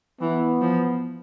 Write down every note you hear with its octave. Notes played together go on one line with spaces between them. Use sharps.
E3 B3
F3